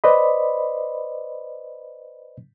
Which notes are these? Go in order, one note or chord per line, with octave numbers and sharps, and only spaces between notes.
B4 C5 D5 D#5 B5